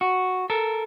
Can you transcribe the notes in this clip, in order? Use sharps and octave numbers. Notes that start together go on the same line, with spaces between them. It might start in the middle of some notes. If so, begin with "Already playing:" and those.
F#4
A4 A#4